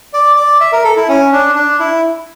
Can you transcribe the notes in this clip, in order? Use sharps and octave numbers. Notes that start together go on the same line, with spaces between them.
D5
D5
E5
A#4
A4
E4
C#4
D4
D4
E4